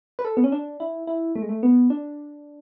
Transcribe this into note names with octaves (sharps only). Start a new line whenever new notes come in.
B4
A4
B3
C#4
D4
E4
E4
A3
G#3
A3
B3
D4